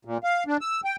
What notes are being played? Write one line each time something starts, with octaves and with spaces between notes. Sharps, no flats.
A#2
F5
D4
E6
G5